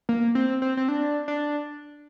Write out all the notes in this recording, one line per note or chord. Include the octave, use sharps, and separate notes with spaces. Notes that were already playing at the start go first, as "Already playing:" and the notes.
A#3
C4
C4
C4
D4
D4